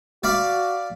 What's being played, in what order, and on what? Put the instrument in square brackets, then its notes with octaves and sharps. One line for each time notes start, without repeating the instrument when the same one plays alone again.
[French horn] F#4 [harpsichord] D5 F5 B5